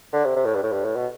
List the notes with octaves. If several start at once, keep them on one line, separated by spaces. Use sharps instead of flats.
D3
C3
C3
A2
G2
A2
G2
A2
B2